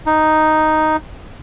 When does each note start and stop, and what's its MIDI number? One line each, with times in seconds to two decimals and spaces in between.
0.07 0.96 63